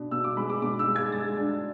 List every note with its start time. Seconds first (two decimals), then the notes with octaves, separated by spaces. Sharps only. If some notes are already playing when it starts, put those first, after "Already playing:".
Already playing: B2 D4
0.11 B2 E6
0.24 D6
0.37 G#3 B5
0.50 D6
0.62 B2 D6
0.79 E6
0.87 G#3
0.96 G#6
1.12 G#3 A6
1.38 D4